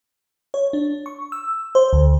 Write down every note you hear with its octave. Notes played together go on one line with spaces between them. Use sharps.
C#5
D4
C#6
E6
C5
D2